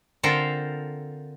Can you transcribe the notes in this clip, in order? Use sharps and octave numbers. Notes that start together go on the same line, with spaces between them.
D3 C4 F4 A4 A#4 C5